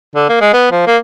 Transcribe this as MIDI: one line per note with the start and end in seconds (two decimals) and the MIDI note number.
0.16 0.27 50
0.29 0.39 58
0.41 0.50 56
0.54 0.68 59
0.72 0.84 53
0.87 0.97 58